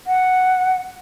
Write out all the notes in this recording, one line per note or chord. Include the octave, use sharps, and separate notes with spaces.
F#5